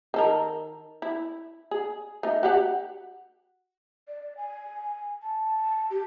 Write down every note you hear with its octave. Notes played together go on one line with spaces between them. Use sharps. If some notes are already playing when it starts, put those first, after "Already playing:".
D#3 A4 A#4
E4
G#4
A3 D#4
F#4 G4 F#5
D5
G#5
A5
G4